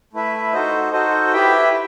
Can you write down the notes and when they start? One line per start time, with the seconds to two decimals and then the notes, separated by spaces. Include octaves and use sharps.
0.13 A3 E4 B4 E5
0.53 D#4 F#4 A4 C5 D#5
0.92 D#4 F#4 A4 C5 D#5
1.33 E4 G4 B4 E5 G5